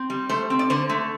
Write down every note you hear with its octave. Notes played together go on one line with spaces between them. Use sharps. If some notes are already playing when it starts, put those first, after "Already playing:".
Already playing: C4
G3
A3 C5
C4
D5
D3 C5
A3